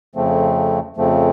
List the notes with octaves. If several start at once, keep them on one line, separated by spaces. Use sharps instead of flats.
F2 C#3 F3 A3 C4
F2 C#3 F3 A3 C4